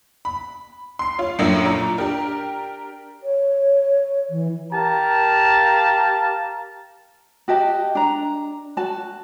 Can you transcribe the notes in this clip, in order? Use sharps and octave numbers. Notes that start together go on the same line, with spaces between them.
B5
C6 C7
F4 C#5
F#2 A2 F#3 A#3 D4 E4
A#2 A#5
D4 G4 A#4
C#5
E3
G4 A#4 F5 A5 A#5
F#4 G4 D#5 A5
D4 A#5
F#4 A5